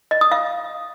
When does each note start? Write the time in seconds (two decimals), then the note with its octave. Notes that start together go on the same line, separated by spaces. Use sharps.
0.11 D#5
0.21 D#6
0.32 F5